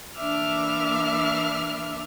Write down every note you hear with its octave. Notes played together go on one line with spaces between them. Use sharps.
E3 A#3 D4 E5 D6 F6